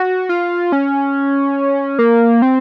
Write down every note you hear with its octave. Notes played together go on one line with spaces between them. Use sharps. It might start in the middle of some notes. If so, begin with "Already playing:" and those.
Already playing: F#4
F4
C#4
A#3
C4